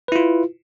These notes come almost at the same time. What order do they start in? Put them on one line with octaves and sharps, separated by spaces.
B4 E4 F4